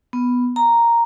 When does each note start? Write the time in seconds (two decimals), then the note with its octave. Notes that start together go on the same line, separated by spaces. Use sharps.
0.13 B3
0.56 A#5